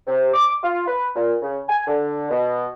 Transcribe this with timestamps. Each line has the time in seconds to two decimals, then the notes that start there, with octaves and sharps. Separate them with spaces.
0.07 C3
0.33 D6
0.62 F4
0.87 B4
1.15 A#2
1.42 C#3
1.68 G#5
1.86 D3
2.29 B2